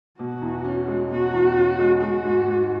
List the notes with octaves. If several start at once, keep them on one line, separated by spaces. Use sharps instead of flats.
B2 F#4
E2
C#4
G#3
B2 F#4
E2
C#4
G#3
G#3 F#4
G#2
G#2